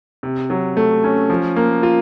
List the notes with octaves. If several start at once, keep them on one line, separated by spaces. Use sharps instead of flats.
C3
F#3
A3
C#4
F3
A#3
F4